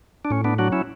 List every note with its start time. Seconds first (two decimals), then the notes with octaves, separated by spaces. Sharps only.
0.25 D4
0.30 A2 C#4
0.44 B3 D4
0.58 F#3 D4 F#4
0.72 C#4 E4